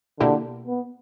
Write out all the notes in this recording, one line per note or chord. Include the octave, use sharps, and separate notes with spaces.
B2 D3 A#3 E4 G4
B3